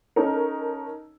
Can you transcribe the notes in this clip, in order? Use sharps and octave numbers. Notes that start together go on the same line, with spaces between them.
C#4 D#4 A4 A#4